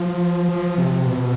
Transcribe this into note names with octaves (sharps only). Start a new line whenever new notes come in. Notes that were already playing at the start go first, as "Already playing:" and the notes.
Already playing: F3
F3
C3
B2